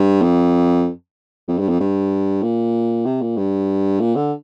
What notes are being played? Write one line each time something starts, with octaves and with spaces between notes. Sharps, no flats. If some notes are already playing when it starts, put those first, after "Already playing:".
Already playing: G2
F2
F2
G2
F2
G2
A#2
C3
A#2
G2
A#2
D3